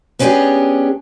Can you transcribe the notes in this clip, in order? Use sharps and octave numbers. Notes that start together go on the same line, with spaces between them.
B3 C#4 D4 F4 G4 G#4